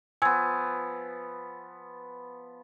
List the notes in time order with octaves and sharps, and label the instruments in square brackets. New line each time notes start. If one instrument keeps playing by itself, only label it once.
[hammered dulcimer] F3 B3 [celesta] G#5 E6 G#6